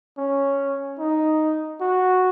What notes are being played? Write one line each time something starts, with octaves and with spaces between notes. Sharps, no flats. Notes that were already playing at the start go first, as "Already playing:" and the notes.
C#4
D#4
F#4